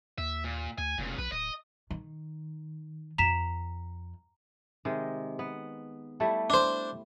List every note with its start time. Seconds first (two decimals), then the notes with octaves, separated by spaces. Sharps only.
0.18 D#2 E5
0.44 A#2
0.78 D2 G#5
0.98 F1 A#2 C#3
1.18 B1 B4
1.32 D1 D#5
1.90 D#3
3.18 F2 A#5 B6 E7
4.85 C3 D#3 G#3
5.39 B3
6.20 G3 A3 E4
6.50 D4 C5